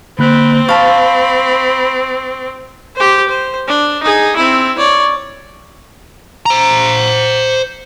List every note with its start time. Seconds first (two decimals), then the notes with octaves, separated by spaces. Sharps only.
0.19 D3 A#3 C4 B5 F#6
0.69 F5 A5 B5 C#6
2.96 G4 C5
3.29 C5
3.67 D4
4.03 D#4 G#4
4.36 C4 E4
4.78 C#5 D5
6.46 C5 A#5